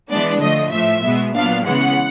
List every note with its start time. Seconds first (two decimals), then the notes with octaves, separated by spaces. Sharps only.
0.10 E3 G#3 B3 D4 D5
0.42 D3 F3 A3 D#5
0.72 A2 F3 A3 E5
1.04 B2 G#3 B3
1.34 A#2 F#3 B3 D4 F5
1.65 C#3 E3 G#3 B3 F#5